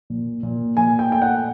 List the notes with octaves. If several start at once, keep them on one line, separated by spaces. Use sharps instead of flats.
A#2
A#2
A#2 G#5
G5
A3 G5
F#5